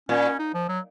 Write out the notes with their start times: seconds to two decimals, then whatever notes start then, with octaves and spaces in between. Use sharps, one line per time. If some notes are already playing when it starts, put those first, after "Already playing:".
0.09 A#2 C#4
0.39 D#4
0.54 F3
0.69 F#3